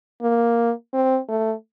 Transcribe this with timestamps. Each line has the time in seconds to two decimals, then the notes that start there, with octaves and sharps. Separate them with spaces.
0.22 A#3
0.93 C4
1.29 A3